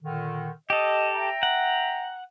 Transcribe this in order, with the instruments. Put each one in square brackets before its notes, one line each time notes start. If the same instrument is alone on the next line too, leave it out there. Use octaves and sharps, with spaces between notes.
[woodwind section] A#2 D3 D#3
[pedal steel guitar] G4 A4 [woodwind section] D#5
[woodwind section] E5 G5 A#5
[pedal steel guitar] F#5